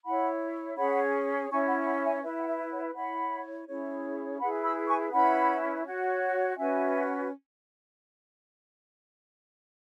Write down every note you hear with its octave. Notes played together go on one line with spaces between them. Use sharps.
E4 C#5 F#5 B5
C#4 G#4 C#5 F#5 B5
C#4 E4 C#5 G#5 C#6
F#5 B5
F#5 B5
E5 G#5
E4 B4 E5
F#5
E5
C#5 F#5
E4 C#5 F#5 B5
C#4 E4 G#4 C#5
E4 G#4 B4 F#5 B5
B5 E6
G#5 C#6
C#4 E4 B4 F#5 B5
F#4 C#5
C#4 F#4 B4 E5 G#5